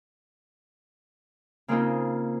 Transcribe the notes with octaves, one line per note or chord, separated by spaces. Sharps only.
C#3 A#3 C4 D#4 F4